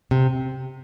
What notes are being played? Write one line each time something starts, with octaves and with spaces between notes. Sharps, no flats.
C3